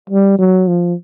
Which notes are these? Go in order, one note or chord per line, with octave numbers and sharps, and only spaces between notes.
G3
F#3
F3